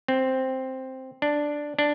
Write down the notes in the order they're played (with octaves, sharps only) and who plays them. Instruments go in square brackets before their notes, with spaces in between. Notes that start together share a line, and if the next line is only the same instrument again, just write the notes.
[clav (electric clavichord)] C4
D4
D4